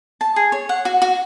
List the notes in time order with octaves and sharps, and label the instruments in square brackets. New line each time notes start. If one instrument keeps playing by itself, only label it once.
[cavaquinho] A5
G#4
C#5
F#5
F#4
F#4